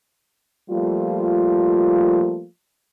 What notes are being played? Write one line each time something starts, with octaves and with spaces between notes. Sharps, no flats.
F3 G3 A3 A#3 F4